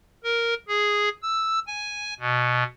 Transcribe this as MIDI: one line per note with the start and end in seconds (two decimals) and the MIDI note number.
0.24 0.54 70
0.68 1.09 68
1.23 1.59 88
1.67 2.14 80
2.20 2.63 47